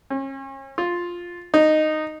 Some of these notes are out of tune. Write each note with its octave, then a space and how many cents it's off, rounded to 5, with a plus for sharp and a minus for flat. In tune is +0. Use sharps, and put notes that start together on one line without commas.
C#4 -40
F4 +5
D#4 -10